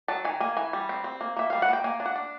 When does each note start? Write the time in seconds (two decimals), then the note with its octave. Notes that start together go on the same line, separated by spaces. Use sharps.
0.08 F#3 A5
0.25 D#3 G#5
0.40 A#3 G#5
0.57 E3 G#5
0.73 G3
0.89 C4
1.04 C4
1.21 A#3
1.36 A#3 E5
1.50 G3 F5
1.62 F#5
1.68 A#3 G5
1.84 A#3 G#5
2.00 D4
2.06 F#5
2.16 D4